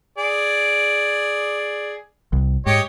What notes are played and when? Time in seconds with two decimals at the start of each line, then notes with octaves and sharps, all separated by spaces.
0.18 G#4 D5
2.33 C2
2.66 G#2 G4 C#5 D#5